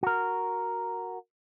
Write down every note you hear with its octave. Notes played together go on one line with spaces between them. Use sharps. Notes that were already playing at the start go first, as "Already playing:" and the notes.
F#4 A#4